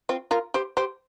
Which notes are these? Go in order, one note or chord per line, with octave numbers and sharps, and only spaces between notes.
C4 F4
F4 A#4
G4 C5
G4 C5